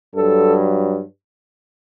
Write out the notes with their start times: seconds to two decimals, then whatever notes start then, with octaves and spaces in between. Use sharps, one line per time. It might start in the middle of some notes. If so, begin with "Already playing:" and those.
0.15 G2 F#3 A4